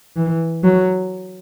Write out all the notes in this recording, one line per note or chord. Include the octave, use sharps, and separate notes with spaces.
E3
F#3